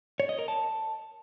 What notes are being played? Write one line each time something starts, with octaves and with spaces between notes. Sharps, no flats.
C#5
D#5
A#4
A5